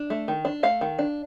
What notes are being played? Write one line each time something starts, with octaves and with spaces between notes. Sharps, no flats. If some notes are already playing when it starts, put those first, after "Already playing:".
Already playing: D4
A3
D#3
D4
A3 F5
D#3
D4